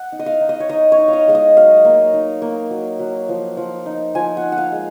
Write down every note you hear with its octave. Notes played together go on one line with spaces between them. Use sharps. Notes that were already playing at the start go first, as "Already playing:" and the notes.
Already playing: F#5
D#4
D#5
F5
D#4
D#5
C#5
D#4 D#5
C#5
D#4
F5
D#5
G#3 F5
D#5
F#3 F5
A#3
D#4
A#3
F#3
F#3
F3
F3
D#4
F3 G#5
F#5
D#4
F#5
F5
G#3